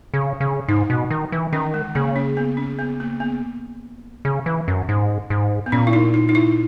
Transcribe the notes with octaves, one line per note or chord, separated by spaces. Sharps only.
C#3
C#3
G#2 D#4
B2
D#3
E3
D#3 C#4
G#3
C#3 A#3
C#4
B3
C#4
B3
A#3
B3
C#3
E3
F#2
G#2
G#2
B3
A#2 C#4
E4
D#4
D#4
D#4
E4